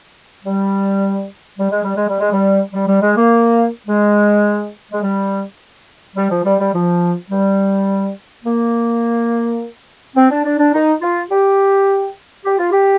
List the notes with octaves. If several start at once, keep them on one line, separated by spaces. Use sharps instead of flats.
G3
G3
G#3
G3
G#3
G3
G#3
G3
G3
G3
G#3
A#3
G#3
G#3
G3
G3
F3
G3
G3
F3
G3
A#3
C4
D4
D4
D4
D#4
F4
G4
G4
F4
G4